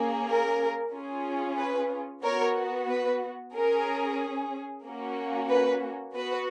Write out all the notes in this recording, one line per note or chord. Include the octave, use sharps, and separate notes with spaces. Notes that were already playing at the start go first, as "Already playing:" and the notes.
Already playing: A#3 C#4 G#4
A#4
C#4 F4 G#4
B4
B3 F#4 A#4 C#5
B4
C#4 G#4 A#4
A#3 C#4 F#4
B4
B3 F#4 B4